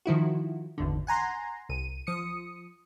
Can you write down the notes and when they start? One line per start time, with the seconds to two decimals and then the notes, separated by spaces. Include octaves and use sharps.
0.06 D#3 F3 E4 F#4
0.78 G#1 E2 D3
1.07 F#5 G#5 A#5 C6
1.69 C2 D#7
2.07 F3 D#6 C#7